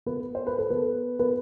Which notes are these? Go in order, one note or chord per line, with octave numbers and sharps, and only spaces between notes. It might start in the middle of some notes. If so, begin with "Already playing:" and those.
B3 B4
C5
B4
A4
B3 B4
B3 B4